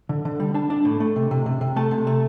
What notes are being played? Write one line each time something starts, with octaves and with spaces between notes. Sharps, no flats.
D3
D3
G3
D4 A5
D4
A2
A3
C3
C3
C3
C3
A3 A5
C3
A3